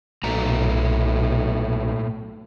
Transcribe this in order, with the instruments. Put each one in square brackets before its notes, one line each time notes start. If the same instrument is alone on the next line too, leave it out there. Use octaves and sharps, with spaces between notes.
[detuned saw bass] B1 [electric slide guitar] A#2 A3 A#5